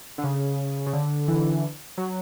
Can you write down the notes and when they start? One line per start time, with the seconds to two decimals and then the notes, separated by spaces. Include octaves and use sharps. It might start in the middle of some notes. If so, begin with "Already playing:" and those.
0.18 D3
0.24 C#3
0.86 C#3
0.93 D3
1.28 E3
1.98 F#3